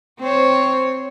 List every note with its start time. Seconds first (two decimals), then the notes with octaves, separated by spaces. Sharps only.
0.19 C4 C5 C#5